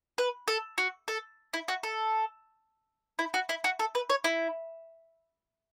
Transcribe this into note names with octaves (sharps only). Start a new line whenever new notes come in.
B4
A4
F#4
A4
E4
F#4
A4
E4
F#4
E4
F#4
A4
B4
C#5
E4